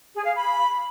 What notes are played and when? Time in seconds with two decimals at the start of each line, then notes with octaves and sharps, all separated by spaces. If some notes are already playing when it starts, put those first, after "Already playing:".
0.14 G#4
0.24 F5
0.34 B5